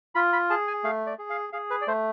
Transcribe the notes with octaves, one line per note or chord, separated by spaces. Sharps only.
F4 B5
B5
G#4 A5
G#5
A3 F5
D5
G#4
F5
G#4 F5
B4
D5
A3 C5